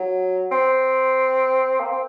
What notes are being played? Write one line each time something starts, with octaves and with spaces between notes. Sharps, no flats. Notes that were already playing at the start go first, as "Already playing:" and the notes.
Already playing: F#3
C4
A#3
C4